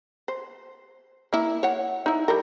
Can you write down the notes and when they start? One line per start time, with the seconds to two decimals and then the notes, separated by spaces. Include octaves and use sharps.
0.28 C5
1.33 A#3 E4
1.63 C#5 F#5
2.06 D#4 E4
2.28 G3 A4 A#4